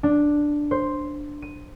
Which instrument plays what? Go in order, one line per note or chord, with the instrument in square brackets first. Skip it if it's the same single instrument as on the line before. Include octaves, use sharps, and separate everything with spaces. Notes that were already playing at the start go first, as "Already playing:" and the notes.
[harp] D4
C5
D#7